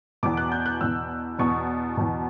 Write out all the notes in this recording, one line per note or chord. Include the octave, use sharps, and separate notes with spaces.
E2 B2 D6
F#6
G6
F#6
E2 B2 E6
E2 B2 C#6
E2 B2